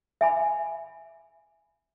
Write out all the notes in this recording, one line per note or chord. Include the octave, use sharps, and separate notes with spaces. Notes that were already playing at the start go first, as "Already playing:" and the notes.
E5 G#5 B5